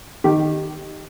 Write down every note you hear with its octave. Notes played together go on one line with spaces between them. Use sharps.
D#3 G4